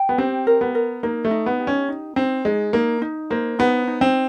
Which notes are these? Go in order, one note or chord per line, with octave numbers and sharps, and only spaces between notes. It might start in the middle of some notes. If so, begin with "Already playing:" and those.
Already playing: G5
B3
C4 G4
A#4
B3
A#4
A#3 D#4
A3
D#4
B3
G4
C#4
D#4
C4 D#4
G#3 D#4
A#3 D#4
D#4
A#3 C5
B3 D#4
D#4
C4